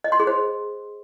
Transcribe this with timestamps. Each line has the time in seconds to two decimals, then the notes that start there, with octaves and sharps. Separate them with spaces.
0.04 D#5
0.12 C6
0.20 G#4
0.27 C5